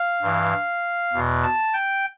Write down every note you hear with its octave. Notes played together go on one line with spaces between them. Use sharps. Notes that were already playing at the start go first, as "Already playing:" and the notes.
Already playing: F5
G2 E3
E2 B2
A5
G5